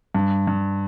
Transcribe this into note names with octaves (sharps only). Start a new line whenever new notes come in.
G2
G2